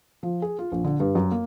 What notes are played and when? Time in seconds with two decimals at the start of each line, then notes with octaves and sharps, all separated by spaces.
0.23 F3
0.42 G#4
0.59 F4
0.72 A#1
0.84 D3
1.00 G2
1.15 F#2
1.31 A#3